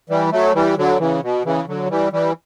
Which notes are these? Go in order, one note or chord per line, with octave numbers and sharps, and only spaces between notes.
E3 G3
F#3 A3
E3 G3
D3 F#3
C#3 E3
B2
C#3 E3
D3 F#3
E3 G3
E3 G3